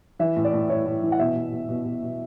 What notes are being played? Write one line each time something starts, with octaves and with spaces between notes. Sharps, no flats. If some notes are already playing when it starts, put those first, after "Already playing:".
E3 E5
A2
D5
A2
A2 C#5
A2
E3
F#5
B2 E5
B2
B2
B2
B2
B2